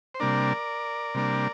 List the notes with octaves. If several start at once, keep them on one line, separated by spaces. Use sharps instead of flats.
C5
C3 G3 A#3 D4 A#4 D5
C3 G3 A#3 D4